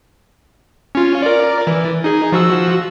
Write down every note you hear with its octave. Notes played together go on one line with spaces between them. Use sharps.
C#4 F4
A#4 D5
E3
D#4 G#4
F3 F#4 E6